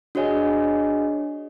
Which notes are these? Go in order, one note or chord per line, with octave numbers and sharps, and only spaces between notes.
D4 F#4 G#4 C#5 D#5 G#5